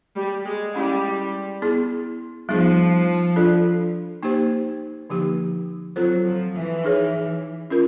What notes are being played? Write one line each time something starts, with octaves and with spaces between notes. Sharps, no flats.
G3
G#3
G3 G#3 C#4 E4
B3 E4 G#4
F3 G3 B3 D#4 G#4
D4 F4 A4 D5
A#3 D#4 G4 C5
D3 F3 A#3 D#4 G4
F#3 C4 F4 A4 C5
F3
E3
D#4 G#4 C#5
C#4 F4 A#4